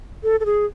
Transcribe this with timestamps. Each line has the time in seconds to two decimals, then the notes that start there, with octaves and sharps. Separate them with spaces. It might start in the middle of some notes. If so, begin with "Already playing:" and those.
0.24 A4
0.40 A4
0.46 G#4